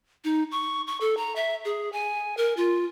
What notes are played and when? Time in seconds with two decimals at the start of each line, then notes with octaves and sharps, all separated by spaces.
0.24 D#4
0.51 C#6
0.87 C#6
1.01 A4
1.17 A#5
1.36 E5
1.65 G#4
1.92 G#5
2.37 A#4
2.57 F4